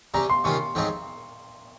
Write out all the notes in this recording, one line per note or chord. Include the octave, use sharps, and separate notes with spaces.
C3 G3 C#4 G4 A#5
C6
C3 D#3 A#3 C#4 F4 C#6
G#2 F3 C4 G4 C#5